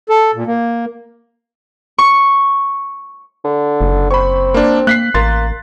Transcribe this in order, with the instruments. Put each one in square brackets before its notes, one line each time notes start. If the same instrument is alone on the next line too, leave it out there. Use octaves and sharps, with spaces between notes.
[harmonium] A4
A#2
A#3
[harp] C#6
[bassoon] D3
[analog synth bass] F#1
[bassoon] C4 [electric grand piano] B5 C#6
[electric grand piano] A#3 D4
[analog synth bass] A#3 [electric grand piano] F#6 B6 C7
[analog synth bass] A1 [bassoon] A#3 [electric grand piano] C6 A6